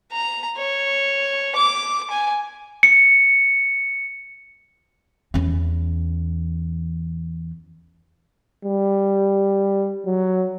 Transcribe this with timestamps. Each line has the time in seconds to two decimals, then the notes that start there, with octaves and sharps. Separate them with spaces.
0.12 A#5
0.58 C#5
1.56 D6
2.10 G#5
2.83 C#7
5.34 E2 C#4
8.65 G3
10.06 F#3